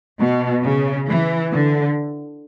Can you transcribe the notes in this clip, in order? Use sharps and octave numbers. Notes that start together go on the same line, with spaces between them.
B2
C#3
E3
D3